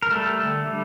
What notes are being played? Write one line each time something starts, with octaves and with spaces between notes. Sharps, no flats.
A#4
G3 A3 A4
D3
G3